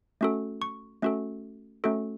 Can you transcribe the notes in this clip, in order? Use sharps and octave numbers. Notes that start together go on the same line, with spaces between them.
A3 C#4 F#4 A4
C#6
A3 C#4 F#4 A4
A3 C#4 F#4 A4